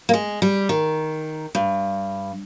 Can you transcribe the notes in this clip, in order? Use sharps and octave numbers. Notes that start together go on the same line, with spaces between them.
A#3
G#3
G3
D#3
G2